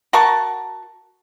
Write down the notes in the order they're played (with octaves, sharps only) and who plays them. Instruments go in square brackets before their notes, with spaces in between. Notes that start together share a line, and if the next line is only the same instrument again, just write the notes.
[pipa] F#4 A#4 A5 C#6